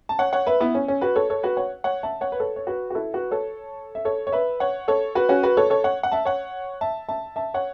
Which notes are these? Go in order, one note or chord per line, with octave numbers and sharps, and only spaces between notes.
A5
C#5 F#5
C#5 F#5
B4 E5
B3 E4
C#4
C#4
F#4 B4
A4 C#5
A4 C#5
F#4 B4
C#5 F#5
C#5 F#5
E5 A5
C#5 F#5
B4
A4 C#5
C#5
F#4 B4
F#4
E4 A4
F#4 B4
A4 C#5
E5
A4 C#5
C#5
B4 E5
C#5 F#5
A4 C#5
F#4 B4
C#4 F#4
F#4 B4
A4 C#5
A4 C#5
C#5 F#5
F#5
E5 A5
C#5 F#5
E5 A5
E5 A5
E5 A5
C#5 F#5